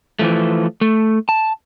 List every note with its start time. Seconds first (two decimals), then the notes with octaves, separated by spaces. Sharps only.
0.19 E3 F3 A3
0.81 A3
1.29 A5